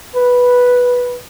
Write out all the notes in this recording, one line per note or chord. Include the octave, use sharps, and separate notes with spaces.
B4